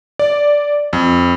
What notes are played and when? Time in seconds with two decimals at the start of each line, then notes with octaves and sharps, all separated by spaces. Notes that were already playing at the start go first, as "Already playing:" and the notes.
0.19 D5
0.93 F2